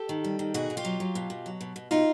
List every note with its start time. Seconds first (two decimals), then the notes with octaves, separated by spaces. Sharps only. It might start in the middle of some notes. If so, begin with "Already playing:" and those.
Already playing: G4 A4
0.09 D#3
0.24 G3
0.39 D#3
0.54 B2 F#4 G#4
0.70 B2
0.77 F4 G4
0.85 F#3
1.00 F#3
1.15 B2
1.30 B2
1.46 F#3
1.61 B2
1.76 B2
1.91 B2 D#4 F4